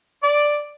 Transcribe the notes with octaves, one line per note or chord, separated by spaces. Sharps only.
D5